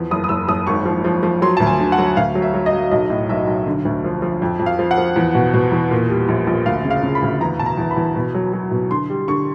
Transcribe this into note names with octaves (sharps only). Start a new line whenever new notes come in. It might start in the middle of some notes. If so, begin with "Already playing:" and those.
Already playing: E2 F3
F#1 D#6
D#6
F#1 E6
F#1 D#6
G#1 C#6
F3
F3
F3
F#3 C6
D2 A5
G#5
D3
F#5
F#3
D2 F5
F#3
E5
F#3
D#5
F#3
B1 D#5
A2
B1 E5
B1
D3
D2
F3
F3
F2
F2
F5
F3
F#5
F3
E2
B2
B2
E2
A#2
G3
A#1
A#1
D2 F5
C#3
F5
C#3
B5
D2
E2 A#5
B2 A5
A#5
E2
B5
E2
B2
F#3
F#3
B2
D3 C6
G3
D3 C#6